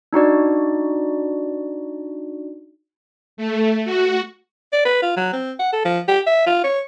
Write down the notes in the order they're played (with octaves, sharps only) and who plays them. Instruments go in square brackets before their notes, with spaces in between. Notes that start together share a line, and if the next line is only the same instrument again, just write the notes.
[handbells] D4 D#4 F#4 D5
[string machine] A3
F#4
[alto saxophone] D5
B4
F4
F#3
C4
F#5
A4
F3
G4
E5
F4
C#5